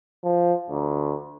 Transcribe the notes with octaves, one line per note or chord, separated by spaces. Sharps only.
F3
D2